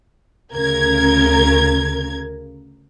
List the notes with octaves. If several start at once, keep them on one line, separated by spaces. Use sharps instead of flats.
D2 C#3 A#4 G#6